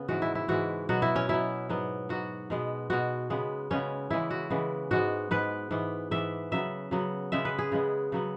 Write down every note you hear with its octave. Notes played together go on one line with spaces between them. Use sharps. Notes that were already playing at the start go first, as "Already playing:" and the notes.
Already playing: C#3 B3
G#2 E3 G#3 F#4
E4
E4
G#2 E3 G#3 F#4
B2 F#3 B3 F#4
E4
C#4
B2 F#3 B3 E4
G#2 F#3 B3
G#2 F#3 B3 F#4
B2 G#3 B3
B2 G#3 B3 F#4
C#3 G#3 B3
C#3 G#3 B3 C#4
C#3 E3 G#3 B3 E4
F#4
C#3 E3 G#3 B3
G#2 G#3 B3 F#4
G#2 G#3 B3 B4
G#2 E3 B3
G#2 E3 B3 E5
C#3 F#3 B3 E5
C#3 F#3 B3
C#3 G#3 B3 E5
B4
G#4
C#3 G#3 B3
C#3 F#3 B3